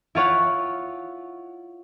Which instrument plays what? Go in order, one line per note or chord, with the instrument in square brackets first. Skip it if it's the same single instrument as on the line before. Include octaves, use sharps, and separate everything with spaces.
[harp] E4 F4 C#5 F#5